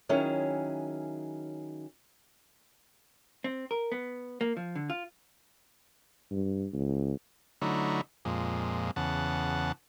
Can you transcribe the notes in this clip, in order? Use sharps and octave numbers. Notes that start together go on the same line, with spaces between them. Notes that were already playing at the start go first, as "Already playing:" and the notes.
D#3 F#3 C#4 E4 G#4
C4
A#4
B3
A#3
F3
D3
F4
G2
C#2
D3 F#3 A3 D#4 E4
F2 A#2 G#3
E2 C#3 F#5 A5